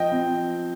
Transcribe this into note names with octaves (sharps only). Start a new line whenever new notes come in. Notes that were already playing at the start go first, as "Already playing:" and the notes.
Already playing: F3 D#5 G5
C4